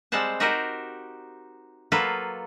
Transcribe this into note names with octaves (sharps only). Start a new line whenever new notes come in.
G3 G#3 C4 C5 F#5 A5
D#4 F#4 G4 A#4 C5 D#5
F#3 A#3 F4 A4 B4